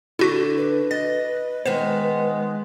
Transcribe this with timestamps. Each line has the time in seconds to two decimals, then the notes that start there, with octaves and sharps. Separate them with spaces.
0.19 D3 D4 E4 F#4 B6
0.57 B4
0.91 D#5 A6
1.66 D#3 G#3 B3 C5 E7